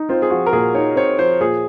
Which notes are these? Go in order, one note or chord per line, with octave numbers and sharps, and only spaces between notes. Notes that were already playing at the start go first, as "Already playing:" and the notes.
Already playing: D#4
C4 F4
G#4
F3 F#4
A#4
A#2 G#4
D#4 C#5
C4 C#5
F3 C5
A#2 G#4